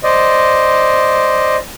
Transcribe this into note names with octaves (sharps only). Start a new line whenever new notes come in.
C5 D5 D#5